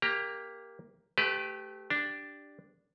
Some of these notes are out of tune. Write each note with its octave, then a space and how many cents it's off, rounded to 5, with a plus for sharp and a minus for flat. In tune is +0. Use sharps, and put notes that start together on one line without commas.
A#3 +0 G4 +15 A#5 +5
A3 -20 G4 +0 B4 +25
D4 +0 G4 +0